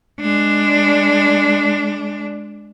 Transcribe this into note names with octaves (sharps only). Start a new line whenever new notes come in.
G#3 D4